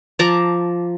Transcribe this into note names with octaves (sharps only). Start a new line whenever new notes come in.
F3 A5 A#5 D6